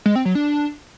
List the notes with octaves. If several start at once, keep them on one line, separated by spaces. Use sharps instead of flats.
G#3
C4
F#3
D4